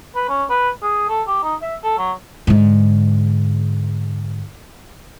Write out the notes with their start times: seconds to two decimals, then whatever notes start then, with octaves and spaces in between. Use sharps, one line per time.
0.16 B4
0.29 C#4
0.50 B4
0.82 G#4
1.09 A4
1.28 G4
1.43 D#4
1.62 E5
1.84 A4
1.98 F#3
2.47 G#2 D3